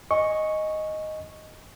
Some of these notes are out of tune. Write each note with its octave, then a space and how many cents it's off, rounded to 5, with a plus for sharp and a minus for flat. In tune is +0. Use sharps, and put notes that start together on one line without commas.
D#5 +0 G#5 +0 C#6 -5